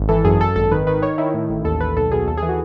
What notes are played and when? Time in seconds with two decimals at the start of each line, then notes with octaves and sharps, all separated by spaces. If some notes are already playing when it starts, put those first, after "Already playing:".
Already playing: G#1
0.09 E3 A4
0.25 F#2 G#4
0.40 F#2 A4
0.56 G#1 A4
0.72 D#3 B4
0.87 D#3 B4
1.02 D#3 C#5
1.18 D#3 E4
1.34 A2
1.50 A1
1.65 D#2 A4
1.80 D#2 B4
1.97 B1 A4
2.12 B2 G#4
2.28 D#2 A4
2.37 G#4
2.43 E3
2.49 F#4